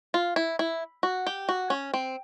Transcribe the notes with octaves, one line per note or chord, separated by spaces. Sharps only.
F4
E4
E4
F#4
G4
F#4
C#4
C4